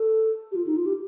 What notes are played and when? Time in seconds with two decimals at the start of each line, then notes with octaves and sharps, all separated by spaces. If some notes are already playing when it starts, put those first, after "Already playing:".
Already playing: A4
0.52 G4
0.55 F4
0.66 D#4
0.76 F4
0.86 G4